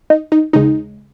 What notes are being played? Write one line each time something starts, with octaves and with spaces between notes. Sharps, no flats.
D#4
D#4
D#2 C#3 G#3 D#4